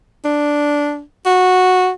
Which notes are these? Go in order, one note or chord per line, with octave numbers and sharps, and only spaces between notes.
D4
F#4